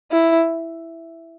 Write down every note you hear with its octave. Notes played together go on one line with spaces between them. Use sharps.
E4